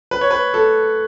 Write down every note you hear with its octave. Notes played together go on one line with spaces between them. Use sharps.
B4
C#5
B4
A4